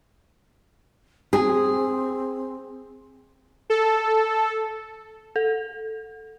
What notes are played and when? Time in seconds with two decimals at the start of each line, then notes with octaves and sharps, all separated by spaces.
1.33 C4 G#4
3.70 A4
5.36 A4